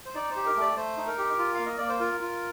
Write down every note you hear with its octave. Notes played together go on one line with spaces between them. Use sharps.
C5
D#4 D5
G4 C5
A#4
A3 D5
A3 C5
D#4
A#4
G4
F4
A#3 F5
D#5
A#3 D5
C5
F4 A#4
F4